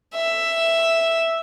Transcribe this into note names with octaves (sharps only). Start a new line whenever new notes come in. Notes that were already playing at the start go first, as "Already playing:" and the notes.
E5